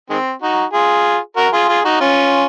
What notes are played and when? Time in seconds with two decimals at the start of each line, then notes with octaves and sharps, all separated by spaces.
0.10 D#3 G#3 C4
0.42 D#4 F#4
0.73 F4 G#4
1.37 F#4 A#4
1.53 F4 G#4
1.68 F4 G#4
1.85 D#4 F#4
2.00 C#4 F4